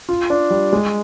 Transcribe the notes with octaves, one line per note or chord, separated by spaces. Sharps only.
F4
D4
G3
G#3